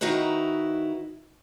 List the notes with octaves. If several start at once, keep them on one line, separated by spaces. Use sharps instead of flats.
D#3 D#4 E4 F#4 B4